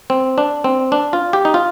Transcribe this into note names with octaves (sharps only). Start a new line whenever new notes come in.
C4
D4
C4
D4
F4
G4
D#4
F4